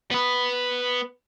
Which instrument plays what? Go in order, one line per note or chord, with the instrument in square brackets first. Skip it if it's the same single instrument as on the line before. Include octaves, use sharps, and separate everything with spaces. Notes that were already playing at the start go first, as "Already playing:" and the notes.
[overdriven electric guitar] B3 B4